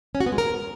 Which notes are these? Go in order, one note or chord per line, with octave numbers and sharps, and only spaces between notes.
C#4
F#4
B3
G#3
A#4